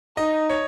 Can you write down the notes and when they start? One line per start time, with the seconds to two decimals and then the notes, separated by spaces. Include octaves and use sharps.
0.17 D#4 D#5
0.49 C#5